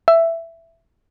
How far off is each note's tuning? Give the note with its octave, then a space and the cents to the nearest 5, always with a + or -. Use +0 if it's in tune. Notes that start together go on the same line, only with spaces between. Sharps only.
E5 +10